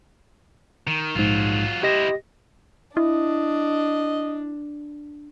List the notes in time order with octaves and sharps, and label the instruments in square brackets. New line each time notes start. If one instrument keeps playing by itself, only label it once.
[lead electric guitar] D#3
[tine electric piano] A#1 G#2 [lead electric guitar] F#3 F4
[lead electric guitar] E4 C5 [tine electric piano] G4 D#5 A#6
[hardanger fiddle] D4 [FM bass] E4 [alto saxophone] D#5